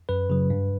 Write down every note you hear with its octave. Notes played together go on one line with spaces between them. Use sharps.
F#2 B4
C#3 F#3
G2